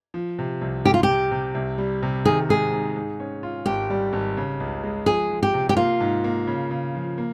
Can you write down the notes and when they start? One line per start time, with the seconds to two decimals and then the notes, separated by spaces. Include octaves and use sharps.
0.14 F3
0.39 C3
0.61 C2
0.85 C2 G4
0.94 F4
1.03 G4
1.09 C3
1.31 C3
1.55 C2
1.78 G3
2.03 C3
2.25 D#3 G#4
2.49 G#2 G#4
2.73 G#2
2.96 G#2
3.20 C#4
3.43 F4
3.66 G#1 G4
3.90 G3
4.13 G#1
4.37 C#3
4.60 C#2
4.83 G#3
5.06 F3 G#4
5.30 F3
5.43 G4
5.54 C3
5.69 G4
5.77 A#3 F4
6.00 G#2
6.24 A#3
6.47 C#3
6.71 C#3
6.95 F3
7.18 A#3